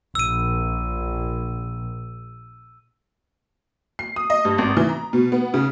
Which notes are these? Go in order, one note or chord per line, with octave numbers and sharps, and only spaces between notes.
A#1 E6 D#7
C7
D#6
D#5
G2
G#1
E3
A#5
B2
B3
C#3